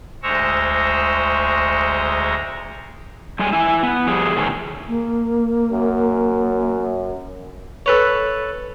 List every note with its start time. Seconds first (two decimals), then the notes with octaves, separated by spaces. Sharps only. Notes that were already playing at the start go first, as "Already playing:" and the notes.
0.23 D2 G#3 C5 A#5 C#6 E6
3.39 G3 G#3 C#4 G#5
3.53 E4 G#5
3.83 B3
4.07 F3 G3 G#4
4.37 B2 D#3 A3 C#4 G#4
4.88 A#3
5.72 F#2
7.86 A4 B4 C#5